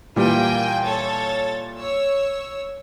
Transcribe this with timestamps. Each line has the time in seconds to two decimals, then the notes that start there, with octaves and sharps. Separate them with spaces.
0.16 A#2 E3 G3 A#3 G5 G#5
0.83 A4 C#5 A6
1.78 C#5 E6